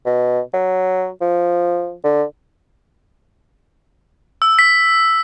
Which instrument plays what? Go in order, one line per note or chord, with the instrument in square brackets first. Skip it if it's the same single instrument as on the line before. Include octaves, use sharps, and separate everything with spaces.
[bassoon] B2
F#3
F3
D3
[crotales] E6
B6